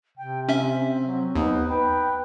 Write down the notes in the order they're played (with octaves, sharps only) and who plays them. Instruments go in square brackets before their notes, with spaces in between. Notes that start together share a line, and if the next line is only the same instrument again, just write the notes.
[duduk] C3 [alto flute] G5
[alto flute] C4 [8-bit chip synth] C#4 E5
[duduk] F#3
[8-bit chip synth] D#2 [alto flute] B3 [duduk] D#4
[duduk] B4 [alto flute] G5